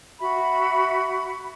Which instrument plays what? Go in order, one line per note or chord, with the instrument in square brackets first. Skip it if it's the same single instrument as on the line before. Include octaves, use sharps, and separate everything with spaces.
[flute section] F#4 E5 B5